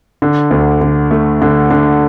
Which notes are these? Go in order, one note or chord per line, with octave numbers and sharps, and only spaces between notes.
D3
D2
D3
A3
D3
D3